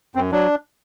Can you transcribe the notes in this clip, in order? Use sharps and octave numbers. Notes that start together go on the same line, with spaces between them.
F#2 C4
F#3 D4